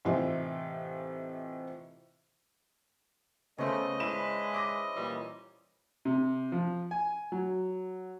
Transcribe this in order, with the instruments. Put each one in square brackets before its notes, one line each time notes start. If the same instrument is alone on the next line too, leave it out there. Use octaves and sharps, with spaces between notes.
[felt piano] A2 C3 E3 C4 D#4 F4
[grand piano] C#3 B3 [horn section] A3 [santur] C#4 C5 [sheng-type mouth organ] D#5
[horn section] G#3 D4 B4 [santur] E4 [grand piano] E7
[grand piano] D6 D#6 A#6
[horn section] A#2 E3 G3
[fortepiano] C3
F3
G#5
F#3